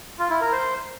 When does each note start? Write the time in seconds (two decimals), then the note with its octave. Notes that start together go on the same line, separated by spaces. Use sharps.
0.19 F4
0.30 E4
0.41 A#4
0.52 C5